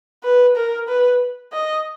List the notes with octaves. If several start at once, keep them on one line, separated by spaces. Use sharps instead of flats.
B4
A#4
B4
D#5